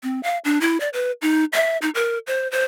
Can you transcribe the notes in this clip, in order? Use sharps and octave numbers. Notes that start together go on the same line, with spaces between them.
C4
F5
D4
E4
D5
B4
D#4
E5
D#4
A#4
C5
C5